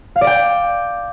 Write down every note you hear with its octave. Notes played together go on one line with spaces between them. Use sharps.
F5
D5
G5